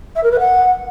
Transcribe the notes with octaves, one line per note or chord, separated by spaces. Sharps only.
E5
A#4
B4
F#5